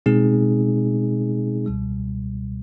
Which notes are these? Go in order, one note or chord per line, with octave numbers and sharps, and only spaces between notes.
B2 G#3 C4 D#4 G#4
C#2 B2 G3